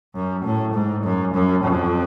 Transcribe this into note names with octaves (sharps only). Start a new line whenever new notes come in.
F#2
A2
G#2
F#2
F#2
F2